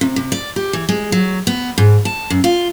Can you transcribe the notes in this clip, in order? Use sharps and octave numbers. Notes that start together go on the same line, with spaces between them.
C3
C3
D5
G4
E3
G#3
F#3
B3
G#2
A5
F#2
F4